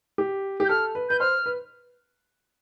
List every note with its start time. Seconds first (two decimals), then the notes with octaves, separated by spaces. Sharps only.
0.18 G4
0.60 G4
0.65 G6
0.69 A4 F6
0.95 B4
1.09 B4 G6
1.20 C5 F6
1.46 B4